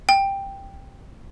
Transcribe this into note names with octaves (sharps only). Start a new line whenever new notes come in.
G5